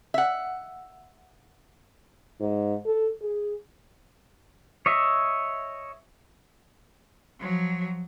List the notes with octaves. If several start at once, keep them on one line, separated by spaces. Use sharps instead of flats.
E5 F#5
G#2
A4
G#4
C#5 D#5 E5
F3 F#3